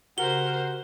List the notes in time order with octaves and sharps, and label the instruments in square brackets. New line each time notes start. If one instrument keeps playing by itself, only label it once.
[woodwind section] C#3 F#5 [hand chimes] F#4 G4 [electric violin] A#4 C5 [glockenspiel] G7